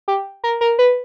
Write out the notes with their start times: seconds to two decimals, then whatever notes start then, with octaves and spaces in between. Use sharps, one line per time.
0.08 G4
0.44 A#4
0.61 A#4
0.79 B4